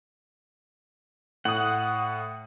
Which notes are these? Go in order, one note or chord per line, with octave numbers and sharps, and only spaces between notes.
A2 F#5 D#6